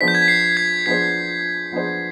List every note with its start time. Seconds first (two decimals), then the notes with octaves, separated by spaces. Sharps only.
0.01 F3 B3 D4 G#4 C5 B6
0.08 G6
0.15 G#6
0.22 B6
0.28 C7
0.57 G#6
0.86 F3 B3 D4 G#4 C5 B6
1.72 F3 B3 D4 G#4 C5